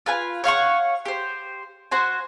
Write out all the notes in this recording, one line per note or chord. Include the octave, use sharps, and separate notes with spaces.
F4 B4 G#5
C#5 F5 F#5 C#6
G4 C5
F#4 C5 G#5